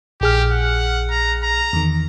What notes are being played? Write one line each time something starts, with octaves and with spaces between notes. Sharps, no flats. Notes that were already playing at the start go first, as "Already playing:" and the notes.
A#1 G4 G#4 F6
F#5
A#5
A#5
E2 D#3